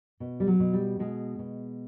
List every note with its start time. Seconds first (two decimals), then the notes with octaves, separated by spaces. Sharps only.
0.20 B2
0.40 G3
0.47 F#3
0.60 B2
0.73 G3
0.99 B2 G#3
1.39 B2